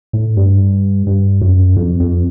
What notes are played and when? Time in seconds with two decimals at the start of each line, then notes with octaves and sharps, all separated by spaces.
0.13 A2
0.37 G2
1.07 G2
1.42 F#2
1.76 F2
2.00 F2